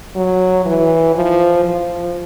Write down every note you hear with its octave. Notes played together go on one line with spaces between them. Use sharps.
F#3
E3
F3
F3